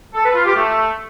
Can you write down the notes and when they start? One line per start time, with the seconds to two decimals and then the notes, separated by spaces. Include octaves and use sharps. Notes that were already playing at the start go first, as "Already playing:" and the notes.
0.14 A4
0.24 B4
0.35 F4
0.45 G4
0.55 A3